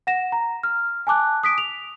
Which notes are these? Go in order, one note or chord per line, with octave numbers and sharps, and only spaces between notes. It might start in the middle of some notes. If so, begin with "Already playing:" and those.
F#5 A#6 E7
A#5
F6
G#5 A5 D6 F#6
D#6 B6 D7
F7